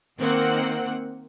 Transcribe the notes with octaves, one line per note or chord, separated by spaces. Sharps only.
D#3 A#3 C4 F#5 F#6